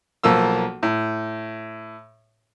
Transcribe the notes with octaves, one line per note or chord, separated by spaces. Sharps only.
B1 F3 A#3 E6
A2